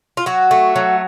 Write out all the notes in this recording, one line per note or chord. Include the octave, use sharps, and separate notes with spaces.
F4
F#3 F#4
A3
F#3